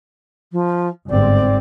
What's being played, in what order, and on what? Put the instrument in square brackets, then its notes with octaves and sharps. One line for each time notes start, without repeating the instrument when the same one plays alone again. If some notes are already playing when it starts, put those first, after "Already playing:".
[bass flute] F3
[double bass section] G1 G#2 C4 [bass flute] D5